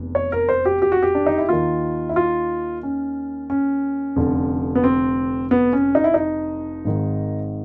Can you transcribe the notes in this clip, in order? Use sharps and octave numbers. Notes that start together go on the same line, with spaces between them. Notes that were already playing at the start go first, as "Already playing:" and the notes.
Already playing: F1 E2
C#5
A#4
C5
G4
G4
F#4
G4
D4
D#4
E4
D#2 D#3 F4
E4
F4
C#4
C#4
F1 F2 D3
B3
C4
B3
C#4
D#4
E4
D#4
G#1 G#2 D#3